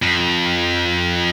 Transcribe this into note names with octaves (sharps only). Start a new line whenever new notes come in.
F2